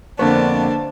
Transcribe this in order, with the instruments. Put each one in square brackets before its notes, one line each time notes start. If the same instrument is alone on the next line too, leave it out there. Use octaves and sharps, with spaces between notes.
[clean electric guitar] F2 B3 [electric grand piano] D3 A#3 C#6 [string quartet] D4 [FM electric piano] C5